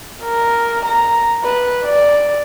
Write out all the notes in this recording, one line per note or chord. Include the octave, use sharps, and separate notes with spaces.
A#4
A#5
B4
D5